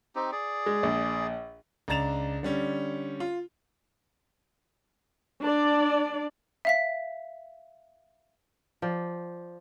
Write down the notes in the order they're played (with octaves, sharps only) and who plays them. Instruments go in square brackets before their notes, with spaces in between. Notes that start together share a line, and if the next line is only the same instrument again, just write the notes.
[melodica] C4 D#4 G4
G#4 D5
[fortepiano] G#3
A#1
[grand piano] C#2 D4 A#5 A6 E7 F7
D3 G3 C#4
F4
[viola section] D4 D5
[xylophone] E5 F5 B6
[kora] F3 D5 G5